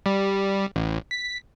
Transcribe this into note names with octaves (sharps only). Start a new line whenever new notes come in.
G3
A1
B6